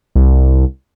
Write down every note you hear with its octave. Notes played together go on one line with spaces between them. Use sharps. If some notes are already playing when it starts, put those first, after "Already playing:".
C2